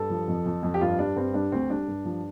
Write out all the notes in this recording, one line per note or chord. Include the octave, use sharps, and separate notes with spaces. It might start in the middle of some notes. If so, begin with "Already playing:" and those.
Already playing: G2 A4
F3
F2
F2
F2
G4
G2 F4
G3 D4
G2 C4
G3 D4
D2 C4
G3 D4
G2
F3